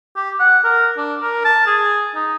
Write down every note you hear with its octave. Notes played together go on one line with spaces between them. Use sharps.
G4
F#5
A#4
D4
A#4
A5
G#4
D#4